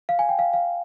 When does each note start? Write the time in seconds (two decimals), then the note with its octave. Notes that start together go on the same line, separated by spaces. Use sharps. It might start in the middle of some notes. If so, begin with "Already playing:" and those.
0.09 F5
0.19 G#5
0.29 G5
0.39 F5
0.53 F5